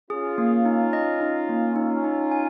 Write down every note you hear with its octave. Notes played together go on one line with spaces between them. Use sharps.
C#4 F4 G#4
A#3
D#4
D#5
D#4
A#3
C#4 D#4 F4
D#4
G#5